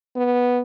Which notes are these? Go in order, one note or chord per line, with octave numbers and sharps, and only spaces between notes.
B3